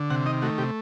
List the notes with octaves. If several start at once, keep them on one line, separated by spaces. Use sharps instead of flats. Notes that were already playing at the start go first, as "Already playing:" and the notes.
Already playing: D3
C3 F#5
D#3 D#5
A3 F#4
C3 G4